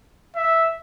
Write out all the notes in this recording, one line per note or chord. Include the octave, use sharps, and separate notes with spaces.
E5